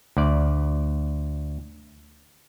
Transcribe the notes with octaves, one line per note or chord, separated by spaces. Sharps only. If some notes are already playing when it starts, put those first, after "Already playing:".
D2 D5